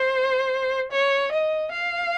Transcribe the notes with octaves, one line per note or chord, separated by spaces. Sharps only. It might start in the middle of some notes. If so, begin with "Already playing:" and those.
Already playing: C5
C#5
D#5
F5